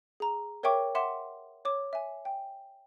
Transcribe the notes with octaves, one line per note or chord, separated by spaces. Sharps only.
G#4 A#5
A#4 C#5 E5 G5 C#6 D6
E5 F#5 C6 D6 E7
C#5 D6
E5 G#5
G5